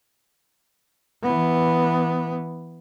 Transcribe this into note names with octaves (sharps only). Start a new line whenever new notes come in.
E3 B3